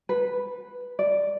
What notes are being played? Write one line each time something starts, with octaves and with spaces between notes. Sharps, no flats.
B4
D5